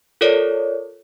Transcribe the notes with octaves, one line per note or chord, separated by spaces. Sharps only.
F4 A4 A#4 C#5 D5